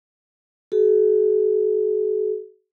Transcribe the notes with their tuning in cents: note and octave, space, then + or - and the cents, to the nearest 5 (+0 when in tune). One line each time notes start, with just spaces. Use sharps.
F#4 +40 A4 -45